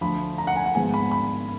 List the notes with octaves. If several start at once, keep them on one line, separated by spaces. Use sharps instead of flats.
D2 D3 F3 B5
A#5
F#5
G#5
F#5
G#1 G#2 F3 B3 G#5
B5
B5